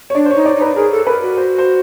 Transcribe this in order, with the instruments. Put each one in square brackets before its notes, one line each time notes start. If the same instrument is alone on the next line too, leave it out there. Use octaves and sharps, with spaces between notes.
[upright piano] C#5
[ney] D4 [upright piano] D5
[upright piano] C5
[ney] D#4 [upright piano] C#5
[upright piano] D5
[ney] D#4
[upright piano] B4
[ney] G#4 [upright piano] A#4
[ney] A4
[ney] A#4 [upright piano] B4
[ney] F#4
[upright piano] C5
C5